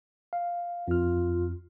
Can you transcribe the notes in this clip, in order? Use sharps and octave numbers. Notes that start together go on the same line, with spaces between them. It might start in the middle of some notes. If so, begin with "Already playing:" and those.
F5
F2 F4 F6